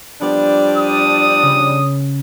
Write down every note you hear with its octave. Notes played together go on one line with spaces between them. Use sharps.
F3 G3 B3 D4
D#6
C#3